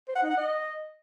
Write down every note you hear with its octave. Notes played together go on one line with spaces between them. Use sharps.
C5
F#5
D#4
F#5
D#5